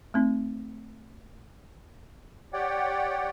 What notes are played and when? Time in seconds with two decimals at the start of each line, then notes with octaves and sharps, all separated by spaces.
0.14 A3 C4 D#4
2.53 G4 C#5 D5 F#5 G5